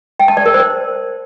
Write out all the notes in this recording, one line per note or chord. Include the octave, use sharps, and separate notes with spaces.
G5
A5
D5
A#4
C5